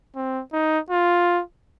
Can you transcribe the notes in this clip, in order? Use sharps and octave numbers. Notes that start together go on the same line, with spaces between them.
C4
D#4
F4